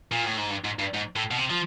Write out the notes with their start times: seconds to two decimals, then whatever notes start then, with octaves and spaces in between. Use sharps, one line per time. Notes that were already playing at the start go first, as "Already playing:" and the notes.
0.12 A#2
0.24 A2
0.37 G#2
0.50 G2
0.65 G#2
0.79 G2
0.94 G#2
1.16 A2
1.31 B2
1.38 C3
1.50 F3